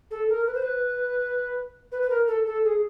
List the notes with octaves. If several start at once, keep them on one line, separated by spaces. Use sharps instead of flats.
A4
A#4
B4
C5
B4
B4
B4
A#4
A4
A4
G#4